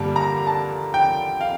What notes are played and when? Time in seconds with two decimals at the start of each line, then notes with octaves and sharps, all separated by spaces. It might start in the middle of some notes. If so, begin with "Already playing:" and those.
Already playing: G2 D3 G3 A#3 A5
0.16 A#5
0.47 A5
0.94 G5
1.41 F5